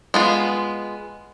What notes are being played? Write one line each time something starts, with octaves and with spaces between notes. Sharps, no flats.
G#3 B3 F4